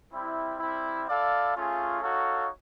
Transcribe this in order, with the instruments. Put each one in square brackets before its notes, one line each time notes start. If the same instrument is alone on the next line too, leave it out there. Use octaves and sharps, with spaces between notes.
[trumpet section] G3 C4 E4
G3 C4 E4
E4 A4 D5 F5
A3 C#4 F4 G#4
D#4 F#4 A4 C#5 F5